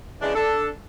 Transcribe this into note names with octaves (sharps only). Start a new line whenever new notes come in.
C#3 E3 G#3 D4
D4 A4